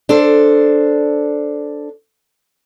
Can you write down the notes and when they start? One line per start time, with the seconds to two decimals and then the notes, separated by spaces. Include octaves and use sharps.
0.09 D4 A4 C5